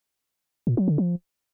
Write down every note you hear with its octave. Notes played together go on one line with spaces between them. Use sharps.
A#2
F#3
D3
F3